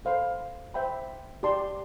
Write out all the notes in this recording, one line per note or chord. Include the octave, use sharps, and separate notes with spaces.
A4 C5 F5 B5
C5 E5 G5 B5
G4 D5 A5 C6